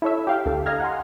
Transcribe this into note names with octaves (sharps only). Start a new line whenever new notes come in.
E4 A4 C#5 E5
G4 F5 G5
D2 A4
D#5 F5 A#5 F6 G#6
F#5 G#5 C6